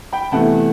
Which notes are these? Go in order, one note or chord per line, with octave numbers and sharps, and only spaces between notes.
G5 B5
E2 C3 E3 A3 F#5 A5